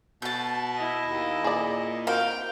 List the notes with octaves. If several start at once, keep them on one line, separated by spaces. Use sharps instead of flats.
B2 A5 G6
E4 D#5
D#2
A#2 G#4 D5
A#3 C4 F#4 F5 G5